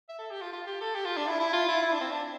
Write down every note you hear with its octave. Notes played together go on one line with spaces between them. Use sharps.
E5
A4
G4
F4
F4
G4
A4
G4
F4
D4
E4
E4
F4
E4
E4
D4
C4
D4